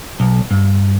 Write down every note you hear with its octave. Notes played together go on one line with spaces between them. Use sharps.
B1
G2